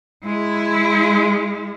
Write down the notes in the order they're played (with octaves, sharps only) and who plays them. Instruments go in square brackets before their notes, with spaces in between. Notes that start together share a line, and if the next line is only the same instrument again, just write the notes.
[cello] G#3 E4